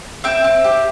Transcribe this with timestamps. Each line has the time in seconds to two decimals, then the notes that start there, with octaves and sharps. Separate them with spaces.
0.24 C4 E5 G5
0.44 C4
0.64 G4